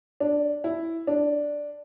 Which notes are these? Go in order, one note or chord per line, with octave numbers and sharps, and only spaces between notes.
D4
E4
D4